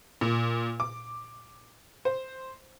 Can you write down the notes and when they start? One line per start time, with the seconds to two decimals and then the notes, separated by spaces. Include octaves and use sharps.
0.21 A#2
0.80 D6
2.05 C5